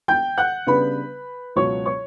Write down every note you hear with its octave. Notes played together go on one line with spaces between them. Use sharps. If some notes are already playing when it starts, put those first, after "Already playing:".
G5 G6
F#5 F#6
C#3 G3 B3 D4 B4 B5
C#2 B2 F#3 C#5 C#6
C#5 C#6